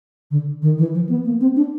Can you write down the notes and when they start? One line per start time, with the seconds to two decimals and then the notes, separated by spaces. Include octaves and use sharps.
0.31 D3
0.62 D#3
0.78 E3
0.94 F3
1.09 B3
1.25 A#3
1.41 C4
1.56 D4